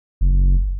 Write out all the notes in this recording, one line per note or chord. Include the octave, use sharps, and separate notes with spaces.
F#1